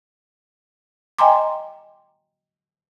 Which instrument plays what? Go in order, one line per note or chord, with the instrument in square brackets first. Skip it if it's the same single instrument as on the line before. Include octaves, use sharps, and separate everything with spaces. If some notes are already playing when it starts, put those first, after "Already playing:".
[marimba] D#5 G5 G#5 A#5 C6 D6